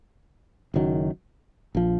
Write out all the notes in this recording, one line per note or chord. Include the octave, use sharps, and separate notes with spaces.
F#1 F#2 D#3 F#3
A#1 F3